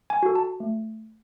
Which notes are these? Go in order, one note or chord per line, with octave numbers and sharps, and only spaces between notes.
G#5
F#4 A4
A5
A3